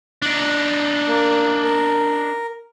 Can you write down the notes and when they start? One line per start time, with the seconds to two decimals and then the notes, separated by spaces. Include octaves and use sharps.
0.22 D4 D#4
1.08 A#3
1.64 A#4